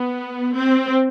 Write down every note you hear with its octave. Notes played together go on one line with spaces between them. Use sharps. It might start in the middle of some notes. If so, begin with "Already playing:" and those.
Already playing: B3
C4